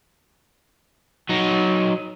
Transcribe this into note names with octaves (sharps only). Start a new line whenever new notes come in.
F#3 D#4